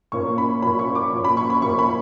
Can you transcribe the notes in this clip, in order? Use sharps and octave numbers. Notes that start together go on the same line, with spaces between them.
A#2 A#3 C#4 C#6
B5
A#2 A#3 C#4 B5
C#6
D6
A#2 A#3 C#4
B5
C#6
B5
A#2 A#3 C#4 C#6
B5